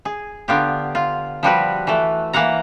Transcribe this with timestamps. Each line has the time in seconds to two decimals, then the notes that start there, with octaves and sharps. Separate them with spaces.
0.05 G#4
0.48 D3 B3 F4 G4
0.95 F4
1.43 F3 G3 F#4 B4
1.87 E3 A3
2.33 E3 A#3 F5 F#5 A#5